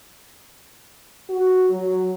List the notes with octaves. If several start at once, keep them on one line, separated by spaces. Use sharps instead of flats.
F#4
F#3